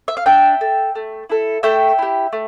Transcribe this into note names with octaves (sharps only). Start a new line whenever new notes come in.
E5
F5
D4 E5 G5
A4
A3
E4 A4
A3 E5 G5
E4 G4
A3